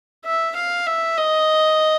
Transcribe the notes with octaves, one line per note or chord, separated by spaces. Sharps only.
E5
F5
E5
D#5